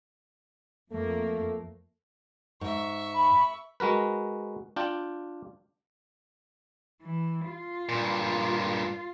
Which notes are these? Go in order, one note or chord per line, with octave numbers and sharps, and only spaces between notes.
F2 A3 A#3
G#2 E5 C#6
B5
G#3 F#4 A#4 B4
D4 F4 G5
E3
F4
G2 A#2